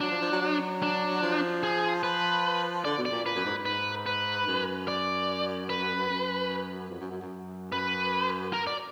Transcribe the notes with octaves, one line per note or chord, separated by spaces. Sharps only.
F#3 D4
F3
F3
F#3
F#3
D4
F3
G#4
F3 B4
D3 D5
B2
D5
A#2
A#2 B4
F#2
G#2
G#2 B4
B4
F#2
D5
B4
F#2
F2
F#2
F#2
F#2
F#2 B4
A#4
D5